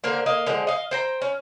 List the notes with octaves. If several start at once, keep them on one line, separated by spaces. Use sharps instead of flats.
D3 A#3 A#4 C5
A#3 D#5 F5
D3 F3 G#3
D#5 F5
C5 G5 A#5
C#4